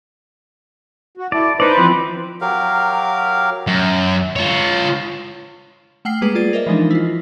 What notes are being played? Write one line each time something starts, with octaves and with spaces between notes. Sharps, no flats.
F#4
E4 A4 D5
D#4 B4 C5 D5
E3 F3 C4
F#3 G4 A#4 F5
F#2
F4 C#5
A3 F#5 G5 F6 C7
G3 G#3 A#3 G#4 B4
F4 G#4 D5 A6
A#4 C5 D#5 E5
E3 F3 G#3 D4 D#4
E4 F4